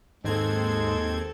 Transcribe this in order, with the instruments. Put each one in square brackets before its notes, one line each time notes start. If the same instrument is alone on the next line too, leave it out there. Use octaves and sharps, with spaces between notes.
[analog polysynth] D#2 C4 G#6 [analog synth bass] G#2 [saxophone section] G#3 [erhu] A4